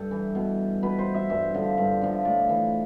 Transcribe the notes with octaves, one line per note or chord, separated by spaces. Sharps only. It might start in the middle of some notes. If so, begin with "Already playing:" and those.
Already playing: G2 G4 A4
E3
B2
B2 B4
C5
E5
G2 E5
D3 F3
G2
D3 F3
A2 D5
E3